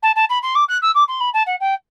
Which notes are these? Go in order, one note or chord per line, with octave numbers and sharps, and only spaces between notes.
A5
A5
B5
C6
D6
F#6
E6
D6
C6
B5
A5
F#5
G5